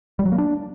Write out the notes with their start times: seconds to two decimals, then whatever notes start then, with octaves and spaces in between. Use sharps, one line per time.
0.19 G3
0.25 F#3
0.32 A#3
0.38 D4